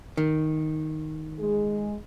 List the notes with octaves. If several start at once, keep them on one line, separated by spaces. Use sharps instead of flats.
D#3
G#3 G#4